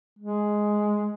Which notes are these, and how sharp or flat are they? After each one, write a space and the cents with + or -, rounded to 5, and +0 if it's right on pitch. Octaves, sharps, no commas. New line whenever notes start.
G#3 +5